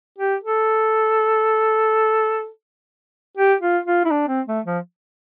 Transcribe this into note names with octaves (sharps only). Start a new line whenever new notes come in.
G4
A4
G4
F4
F4
E4
D4
C4
A3
F3